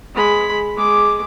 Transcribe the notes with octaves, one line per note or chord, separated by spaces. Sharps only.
G#3 B5
G#3 D6